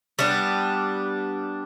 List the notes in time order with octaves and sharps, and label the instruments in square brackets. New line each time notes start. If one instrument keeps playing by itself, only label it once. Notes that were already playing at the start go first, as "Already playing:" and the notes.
[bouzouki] G3 B3 D4